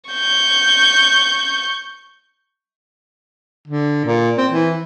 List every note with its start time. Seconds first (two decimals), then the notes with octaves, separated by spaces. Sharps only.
0.10 C#6 G6
3.68 D3
4.05 A#2
4.38 C4
4.51 E3